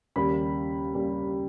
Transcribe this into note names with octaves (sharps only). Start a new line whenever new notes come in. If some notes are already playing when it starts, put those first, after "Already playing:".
D#2 C#3 G3 A#3 B5
C#3 G3 A#3